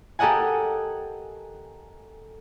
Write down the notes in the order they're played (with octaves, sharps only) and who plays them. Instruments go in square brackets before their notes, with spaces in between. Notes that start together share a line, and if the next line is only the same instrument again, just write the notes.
[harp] G4 A4 A#4 D#5 F#5 G#5